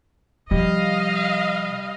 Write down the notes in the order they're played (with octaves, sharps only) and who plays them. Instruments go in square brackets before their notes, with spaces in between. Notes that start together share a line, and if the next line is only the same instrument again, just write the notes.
[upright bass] C3 F3 [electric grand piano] G3 [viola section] D#5 F5